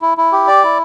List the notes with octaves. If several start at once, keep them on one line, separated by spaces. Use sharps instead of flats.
E4
E4
G4
D5
E4